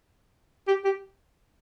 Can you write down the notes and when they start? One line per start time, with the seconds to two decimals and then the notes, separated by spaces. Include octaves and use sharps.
0.68 G4
0.85 G4